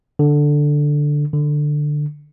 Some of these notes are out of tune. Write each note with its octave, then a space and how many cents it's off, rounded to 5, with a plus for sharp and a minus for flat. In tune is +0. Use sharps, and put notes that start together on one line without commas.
D3 +5
D3 +15